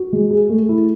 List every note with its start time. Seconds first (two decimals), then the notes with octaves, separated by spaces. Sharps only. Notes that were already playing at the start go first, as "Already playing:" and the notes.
Already playing: F#4
0.13 G#3
0.31 G#4
0.49 A3
0.69 E4